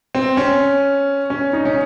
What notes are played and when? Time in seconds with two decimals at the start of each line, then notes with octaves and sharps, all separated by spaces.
0.15 C4
0.37 C#4
1.30 C#4
1.53 D#4
1.65 C#4